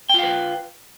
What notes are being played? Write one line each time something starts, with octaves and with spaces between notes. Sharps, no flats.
F4 B4 F5 G5